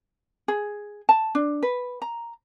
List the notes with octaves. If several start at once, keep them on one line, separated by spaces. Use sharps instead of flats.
G#4
A5
D4
B4
A#5